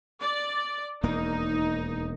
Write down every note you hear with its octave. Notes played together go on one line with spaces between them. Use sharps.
D5
E1 D#2 A#3 D#4